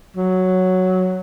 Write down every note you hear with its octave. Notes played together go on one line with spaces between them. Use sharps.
F#3